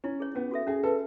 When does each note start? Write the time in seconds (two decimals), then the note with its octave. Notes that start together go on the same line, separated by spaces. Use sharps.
0.04 C#4 E4
0.20 G#4 C#5
0.35 B3 C#4
0.51 F#4 A4 E5
0.67 C#4 G#4
0.83 F#4 A4 B4